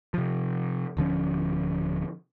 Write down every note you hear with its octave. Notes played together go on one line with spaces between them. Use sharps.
C3 F3
D1 D3 F3 C#4